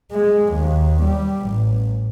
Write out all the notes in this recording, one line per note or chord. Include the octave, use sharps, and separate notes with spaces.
G#3
D#2
G3
A1